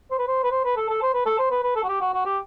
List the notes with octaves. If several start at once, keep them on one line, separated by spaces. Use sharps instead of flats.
C5
B4
C5
B4
C5
B4
A4
A4
C5
B4
A4
C5
B4
B4
A4
F#4
G4
F#4
F#4
G4